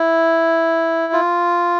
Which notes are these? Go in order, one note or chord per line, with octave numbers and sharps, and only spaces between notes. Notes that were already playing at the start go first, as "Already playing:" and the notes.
Already playing: E4
F4